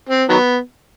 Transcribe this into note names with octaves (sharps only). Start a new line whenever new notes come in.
C4
D#3 F#3 B3